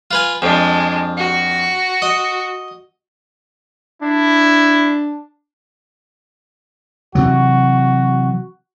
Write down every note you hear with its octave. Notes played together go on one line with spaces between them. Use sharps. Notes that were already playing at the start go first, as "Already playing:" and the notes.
F4 B4 G#5
F2 G#3 D4
F#4
D#5
D4 E4
C3 E3 F#3 F#4